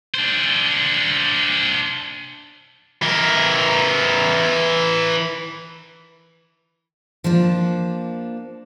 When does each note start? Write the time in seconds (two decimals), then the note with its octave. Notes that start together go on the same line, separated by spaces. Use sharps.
0.14 D4 C5
3.02 E3 A#4
7.24 F3 A#3 D4